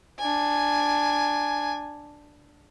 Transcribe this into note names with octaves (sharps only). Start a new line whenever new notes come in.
D4 G#5